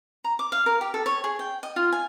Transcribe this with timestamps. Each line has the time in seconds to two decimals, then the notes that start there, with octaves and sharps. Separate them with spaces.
0.24 A#5
0.39 D6
0.52 F5
0.66 A#4
0.81 G4
0.94 A4
1.06 C#5
1.24 G#4
1.39 G5
1.63 D#5
1.76 F4
1.92 G#5